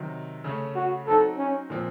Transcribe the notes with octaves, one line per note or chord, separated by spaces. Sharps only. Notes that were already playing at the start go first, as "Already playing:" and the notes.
Already playing: C3 D#3 F#3
C#3 A3 C#4
F#4
F#3 C4 D#4 F#4 A4
C#4
A#2 F3 C4